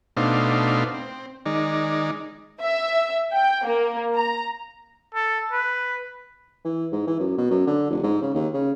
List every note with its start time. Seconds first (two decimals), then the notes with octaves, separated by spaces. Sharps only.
0.17 B2 A3 D4 D#4 C5 F5
0.94 C4
1.46 D#3 G#3 D#4 D5
2.61 E5
3.33 G5
3.65 A#3
4.15 A#5
5.15 A4
5.52 B4
6.65 E3
6.92 G#2
7.07 E3
7.19 F#2
7.38 B2
7.50 F#2
7.67 D3
7.90 F1
8.03 G#2
8.22 C#3
8.35 D#2
8.54 C#3